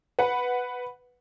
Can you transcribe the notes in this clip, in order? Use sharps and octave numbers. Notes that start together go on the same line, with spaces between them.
B4 F#5